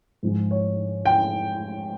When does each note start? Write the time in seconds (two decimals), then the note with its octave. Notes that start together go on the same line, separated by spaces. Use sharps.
0.23 G#2 F3 G#3
0.51 C#5
1.05 G5